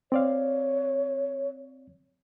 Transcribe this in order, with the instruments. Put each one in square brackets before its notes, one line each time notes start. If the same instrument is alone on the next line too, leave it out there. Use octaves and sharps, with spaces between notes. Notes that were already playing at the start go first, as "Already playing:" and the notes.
[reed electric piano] C4 D5 F5 [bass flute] C#5